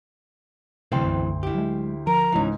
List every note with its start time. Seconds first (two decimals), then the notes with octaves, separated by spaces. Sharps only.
0.92 D2 C3 E3 F#3 C4 A4 G5 C6
1.04 B1 F#2
1.43 E4 G4
1.55 F#3 G#3
2.07 F3 A#4 A#5
2.32 C#2 G#2 E3 C#4